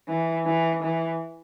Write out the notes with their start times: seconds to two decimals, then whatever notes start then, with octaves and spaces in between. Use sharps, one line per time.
0.08 E3
0.46 E3
0.82 E3